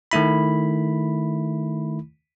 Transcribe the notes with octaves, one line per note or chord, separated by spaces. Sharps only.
D#3 A3 E4 B5